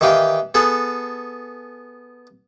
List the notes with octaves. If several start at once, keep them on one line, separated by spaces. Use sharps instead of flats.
D#3 E3 G4 F5 G5
B3 G#4 A4